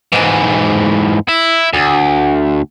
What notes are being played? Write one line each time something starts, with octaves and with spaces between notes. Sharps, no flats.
G#2 E3
E4
D2